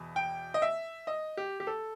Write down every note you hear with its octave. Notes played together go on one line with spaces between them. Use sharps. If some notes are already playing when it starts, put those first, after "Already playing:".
Already playing: E2 B2
G5
D#5
E5
D#5
G4
G4
A4